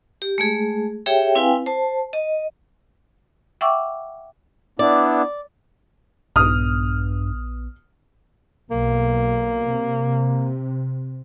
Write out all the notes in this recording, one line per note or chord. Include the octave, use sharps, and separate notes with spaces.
G4
G#3 A3 G#4
G4 G#4 C#5 E5 G5
C4 E4 B4 F5 G5 G#5
C5 A5
D#5
E5 F#5 G5 C#6 D6 E6
B3 D4 E4 D5
A#1 G2 B3 D#6 F6
B1 A#3
C3